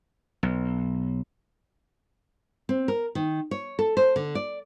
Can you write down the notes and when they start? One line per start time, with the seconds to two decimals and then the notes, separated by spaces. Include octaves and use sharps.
0.43 B1
2.69 C4
2.88 A#4
3.15 D#3
3.51 C#5
3.79 A4
3.97 C5
4.16 D3
4.35 D5